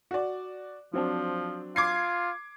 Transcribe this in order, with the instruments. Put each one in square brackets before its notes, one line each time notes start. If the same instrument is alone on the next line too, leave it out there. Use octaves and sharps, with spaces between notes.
[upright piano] F#4 D5
[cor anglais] F3 [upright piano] F#3 C4 D4
[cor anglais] F4 [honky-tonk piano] D6 G#6 C7